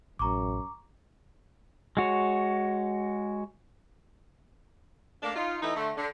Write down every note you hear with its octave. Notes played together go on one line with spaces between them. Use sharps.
A1 F#2 A#5 C#6 D6
G#3 F#4 C#5
A3 A#3 D4
D#4 F4
E3 A3 D#4
D3 A3
D3